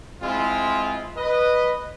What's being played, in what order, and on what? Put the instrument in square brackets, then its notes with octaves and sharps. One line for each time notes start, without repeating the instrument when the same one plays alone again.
[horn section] G#3 C4 E4 F4
B4 D#5